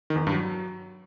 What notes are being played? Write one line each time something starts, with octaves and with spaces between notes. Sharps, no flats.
D#3
E2
D#3
G2
F#3